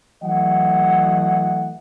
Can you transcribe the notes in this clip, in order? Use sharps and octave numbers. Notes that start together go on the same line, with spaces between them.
E3 F#3 A3 D#5 F#5